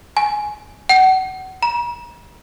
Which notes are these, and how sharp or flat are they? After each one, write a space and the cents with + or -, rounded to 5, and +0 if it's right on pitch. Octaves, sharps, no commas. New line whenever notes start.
G#5 +15
F#5 +30
A#5 +45